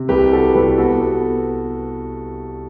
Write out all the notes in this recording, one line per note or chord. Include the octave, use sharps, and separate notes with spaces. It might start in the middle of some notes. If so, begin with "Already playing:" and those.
Already playing: C3
C2 G4 B4
C4 F#4 A4
C2 G4 B4
B3 F#4 A4
B3